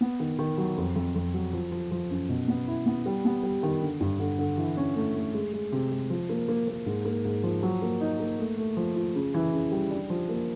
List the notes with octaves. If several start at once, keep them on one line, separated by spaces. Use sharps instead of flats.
B3
D#3
D#3
F#3
F2
F2
F2
F#3
F3
F3
F3
F#2
B2
B3
E4
B3
G3
B3
G3
D#3
D3
G2
D3
D3
E3
C#4
A3
A3
G#3
G#3
C3
G#3
F3
A#3
A#3
A#3
G#2
A#3
G#2
F3
F#3
A#3
D#4
A#3
A3
A3
F3
F4
C#3
E3
C#3
G3
D4
F3
A#3